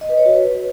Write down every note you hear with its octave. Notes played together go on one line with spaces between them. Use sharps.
D#5
B4
C#5
F#4
B4